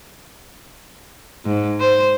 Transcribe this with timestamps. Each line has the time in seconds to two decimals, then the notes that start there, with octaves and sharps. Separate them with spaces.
1.45 G#2
1.80 C5